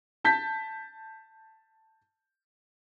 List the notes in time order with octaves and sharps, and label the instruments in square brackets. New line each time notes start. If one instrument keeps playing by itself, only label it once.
[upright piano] A5 G6 B6